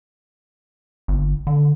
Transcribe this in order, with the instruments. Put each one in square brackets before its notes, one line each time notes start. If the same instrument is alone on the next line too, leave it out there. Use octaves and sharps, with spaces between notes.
[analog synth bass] G1
D3